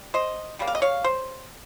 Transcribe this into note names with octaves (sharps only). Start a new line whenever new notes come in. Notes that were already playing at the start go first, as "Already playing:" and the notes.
Already playing: G3
C5 D#5
C#3 G3 A#3
F5
D#5
C#5 F5
C5